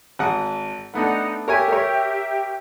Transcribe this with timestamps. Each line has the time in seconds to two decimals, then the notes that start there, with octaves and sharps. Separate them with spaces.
0.19 G#1 F#5 D#6
0.94 A3 B3 D4 D#4 F#5
1.48 G4 A#4 C#5 E5 G#5
1.68 A#4 C#5